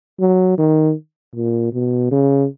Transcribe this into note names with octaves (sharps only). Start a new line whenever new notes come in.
F#3
D#3
A#2
B2
C#3